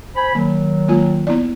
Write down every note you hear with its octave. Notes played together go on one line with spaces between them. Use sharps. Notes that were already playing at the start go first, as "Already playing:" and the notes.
C5 G#5 B5
D#3 F#3 A#3
G#3 A#3 F4
B3 E4 D5